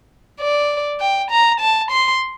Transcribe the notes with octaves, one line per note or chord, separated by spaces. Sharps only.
D5
G5
A#5
A5
C6